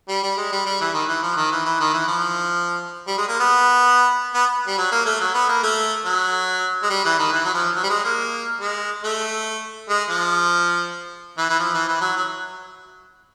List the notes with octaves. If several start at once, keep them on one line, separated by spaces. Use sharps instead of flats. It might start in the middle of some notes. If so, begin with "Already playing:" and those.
G3
G3
G#3
G3
G3
E3
D#3
E3
F3
D#3
E3
E3
D#3
E3
F3
G3
G#3
A#3
B3
B3
G3
F#3
A#3
A3
F#3
B3
A#3
A3
F#3
G#3
G3
E3
D#3
E3
F#3
F3
F#3
G3
G#3
A#3
G#3
A3
G#3
F3
E3
E3
F3
E3
E3
F#3
F#3